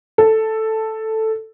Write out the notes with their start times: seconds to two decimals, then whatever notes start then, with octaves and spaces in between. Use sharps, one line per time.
0.18 A4